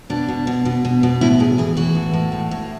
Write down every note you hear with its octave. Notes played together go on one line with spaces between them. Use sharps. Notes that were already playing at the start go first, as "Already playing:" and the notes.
B2 D4
B2
B2
B2
B2
B2
A2 E4
A2 G#4
E3 G#4
E3 F#4
A2
A2
A2
A2